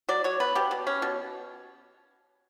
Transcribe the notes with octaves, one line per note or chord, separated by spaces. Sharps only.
F#3 D5
F#3 C#5
B3 B4
B2 G4
B2
C#4
B2